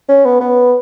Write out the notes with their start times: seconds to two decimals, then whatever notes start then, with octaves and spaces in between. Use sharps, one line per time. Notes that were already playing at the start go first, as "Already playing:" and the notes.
0.09 C#4
0.25 B3
0.40 B3